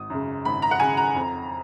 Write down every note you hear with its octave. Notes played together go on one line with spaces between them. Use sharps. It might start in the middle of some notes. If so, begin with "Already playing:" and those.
Already playing: G#1 D#6
F#2 C#3
G#1 B5
A#5
F#5
F#2 C#3 G#5
A#5
F2